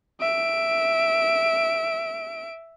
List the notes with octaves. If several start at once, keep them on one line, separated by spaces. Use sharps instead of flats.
E5 D7